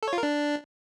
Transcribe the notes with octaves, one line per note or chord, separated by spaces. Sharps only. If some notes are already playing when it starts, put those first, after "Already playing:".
A4
C#5
F4
A#4
D4